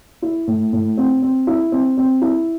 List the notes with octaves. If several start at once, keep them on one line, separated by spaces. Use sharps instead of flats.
E4
A2
A2
C4
C4
E4
C4
C4
E4